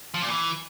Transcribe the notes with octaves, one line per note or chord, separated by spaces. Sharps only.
F3
A#2
E3